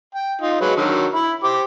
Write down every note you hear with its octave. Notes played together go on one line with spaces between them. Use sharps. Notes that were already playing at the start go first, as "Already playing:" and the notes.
G5
D#4 F4
F#3 G#3 B4
D3 D#3 F#3
E4 B5
G4 C5 D6